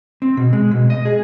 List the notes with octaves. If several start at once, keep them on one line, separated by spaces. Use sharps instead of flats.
C4
B2
G#3
B2
D#5
G#4